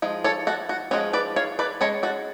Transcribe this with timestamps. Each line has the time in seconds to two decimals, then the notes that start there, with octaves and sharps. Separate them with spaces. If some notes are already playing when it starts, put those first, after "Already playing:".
0.02 F3 G#3
0.24 A4 C#5
0.47 F#4 A4
0.69 F#4
0.91 F3 G#3 C#4 F#4
1.13 B4 D5
1.36 C#5 F5
1.59 B4 D5
1.81 G#3 C#4 A4 C#5
2.03 F#4 A4